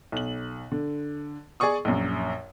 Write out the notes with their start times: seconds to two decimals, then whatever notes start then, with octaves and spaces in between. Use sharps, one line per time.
0.12 B1 F#7
0.72 D3
1.60 G#4 D5 G#5 C#6 D#6
1.85 A#1 F#2